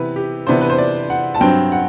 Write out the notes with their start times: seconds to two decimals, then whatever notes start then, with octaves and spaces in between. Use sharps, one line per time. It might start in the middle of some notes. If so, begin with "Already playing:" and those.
Already playing: C3 E3 B3 B4
0.16 G4
0.47 C3 E3 B3 D4 C5
0.61 B4
0.70 C5
0.78 D5
1.10 F#5
1.35 A5
1.41 G2 F#3 C4 G5
1.72 F#5